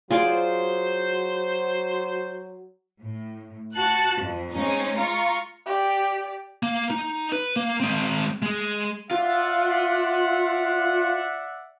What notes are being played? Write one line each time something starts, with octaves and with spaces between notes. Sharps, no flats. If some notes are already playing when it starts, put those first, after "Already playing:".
F#3 F4 G#4 C5 D5
A2
F#4 A5 F#6
F2
G#3 C4 C#4 D#4
F4 A#5 C#6
G4 D5
A#3
D#4
B4
A#3
G#3 C4
G#3 G#4
F4 D5 E5 F#5